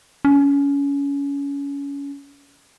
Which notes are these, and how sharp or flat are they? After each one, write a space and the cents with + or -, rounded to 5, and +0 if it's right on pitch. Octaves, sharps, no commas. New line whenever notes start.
C#4 +25